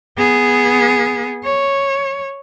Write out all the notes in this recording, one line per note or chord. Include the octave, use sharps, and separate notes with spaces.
B3 G#4
C#5